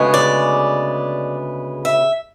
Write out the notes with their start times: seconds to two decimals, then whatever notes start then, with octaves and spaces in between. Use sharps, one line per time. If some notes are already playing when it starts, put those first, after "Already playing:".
Already playing: D2 C#3 G#3 B3
0.14 D5
1.85 E5